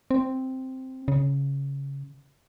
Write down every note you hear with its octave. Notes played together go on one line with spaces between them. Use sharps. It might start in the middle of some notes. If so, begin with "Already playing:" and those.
C4
C#3